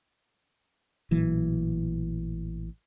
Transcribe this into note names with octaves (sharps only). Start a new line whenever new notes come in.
A1 A#2 E3 F#3